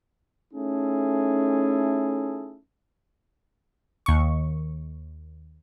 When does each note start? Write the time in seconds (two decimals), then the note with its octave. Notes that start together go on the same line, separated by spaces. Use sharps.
0.54 A3 C#4 D#4 E4 G#4 A4
4.06 D#2 C#6